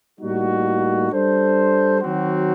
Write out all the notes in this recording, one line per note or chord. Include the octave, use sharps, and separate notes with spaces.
A2 G3 A#3 D#4 F#4
G3 D4 A4 C5
D#3 F#3 C4 F#4